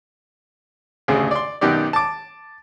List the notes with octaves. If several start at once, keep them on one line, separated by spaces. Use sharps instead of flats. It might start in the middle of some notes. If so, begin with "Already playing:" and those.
A1 D2 C#3 G#4
D5 C6
F#2 B2 D#3 G4 D5
A5 D6